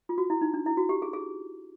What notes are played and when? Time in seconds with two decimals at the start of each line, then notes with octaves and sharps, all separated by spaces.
0.09 F4
0.18 F#4
0.30 E4
0.41 D#4
0.54 D4
0.66 E4
0.77 F#4
0.89 G4
1.02 G#4
1.13 G#4